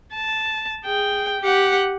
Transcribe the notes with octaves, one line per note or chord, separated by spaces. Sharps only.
A5
G#4 G5
G4 F#5